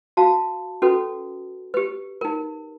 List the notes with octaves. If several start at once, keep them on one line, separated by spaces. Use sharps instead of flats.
F#4 F5 A5
C#4 F#4 A4 B4
G4 B4
D#4 A#4